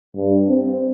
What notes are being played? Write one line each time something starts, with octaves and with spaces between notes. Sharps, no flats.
G2
C4